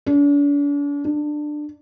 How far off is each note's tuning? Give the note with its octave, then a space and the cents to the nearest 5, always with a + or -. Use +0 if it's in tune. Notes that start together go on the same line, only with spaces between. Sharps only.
D4 -40
D4 +20